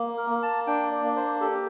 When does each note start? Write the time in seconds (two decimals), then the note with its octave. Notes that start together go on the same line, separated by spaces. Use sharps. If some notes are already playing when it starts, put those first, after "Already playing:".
Already playing: A#3
0.18 A#4
0.30 A#3
0.43 A5
0.67 D4 G5
0.92 D5
1.04 A#3
1.16 C5
1.41 G4 A4